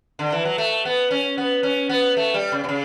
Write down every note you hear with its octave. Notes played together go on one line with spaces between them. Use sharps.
D3
E3
F#3
A3
B3
C#4
B3
C#4
B3
A3
G3
C#3
B2
C#3